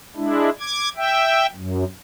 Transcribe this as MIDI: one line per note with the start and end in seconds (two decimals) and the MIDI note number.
0.16 0.50 56
0.16 0.50 62
0.16 0.50 64
0.60 0.89 86
0.60 0.89 92
0.96 1.46 76
0.96 1.46 79
1.55 1.84 42